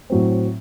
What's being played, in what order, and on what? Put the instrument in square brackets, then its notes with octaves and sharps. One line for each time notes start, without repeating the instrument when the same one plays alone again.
[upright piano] A2 F#3 C4